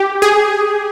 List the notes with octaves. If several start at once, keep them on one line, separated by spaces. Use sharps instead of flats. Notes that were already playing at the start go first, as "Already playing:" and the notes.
Already playing: G4
G#4